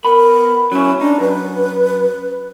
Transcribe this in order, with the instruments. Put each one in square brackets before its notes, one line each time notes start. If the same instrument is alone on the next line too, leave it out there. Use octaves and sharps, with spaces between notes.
[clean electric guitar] B3 B5 [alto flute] A#4
[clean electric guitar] F#3 E4 [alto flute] C#4
[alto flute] D4 [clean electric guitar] D#4
[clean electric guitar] F#2 [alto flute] B4